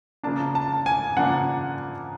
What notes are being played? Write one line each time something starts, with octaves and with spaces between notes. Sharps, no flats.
C#3 F3 A#3 D4 A5
A5
G#5
C#3 F3 A#3 D4 F#5